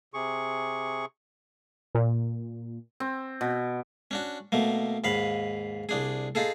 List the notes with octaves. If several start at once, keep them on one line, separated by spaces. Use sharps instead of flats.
C3 G#4 C#6
A#2
C4
B2
C#4 D4 F#4
B2 A3 A#3
D#2 G#2 F5 B5
C2 D4 G#4
D#4 F4 G#4 A4